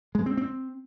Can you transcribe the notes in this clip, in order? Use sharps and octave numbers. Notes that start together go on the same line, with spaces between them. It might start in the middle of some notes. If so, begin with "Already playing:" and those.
G#3
C4
C4